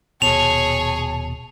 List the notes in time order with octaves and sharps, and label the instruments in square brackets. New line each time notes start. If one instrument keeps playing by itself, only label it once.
[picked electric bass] D#1 B2 [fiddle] G#4 C#5 [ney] A5 [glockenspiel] F7